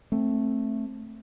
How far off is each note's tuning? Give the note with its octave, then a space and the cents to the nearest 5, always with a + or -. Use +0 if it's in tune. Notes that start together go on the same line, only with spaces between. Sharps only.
A3 +0 C4 +15